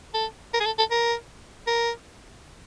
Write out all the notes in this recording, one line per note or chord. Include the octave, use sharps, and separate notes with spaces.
A4
A#4
G#4
A4
A4
A#4
A#4